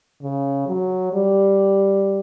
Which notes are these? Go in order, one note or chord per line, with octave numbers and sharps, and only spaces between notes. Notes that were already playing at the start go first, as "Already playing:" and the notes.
C#3
F#3
G3